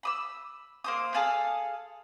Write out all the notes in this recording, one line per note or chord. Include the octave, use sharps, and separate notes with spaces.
B5 D#6 E6
A#3 C5 D#6
G#4 A4 F5 D#6